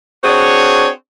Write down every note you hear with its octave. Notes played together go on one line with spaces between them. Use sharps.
C4 D4 F#4 G#4 C#5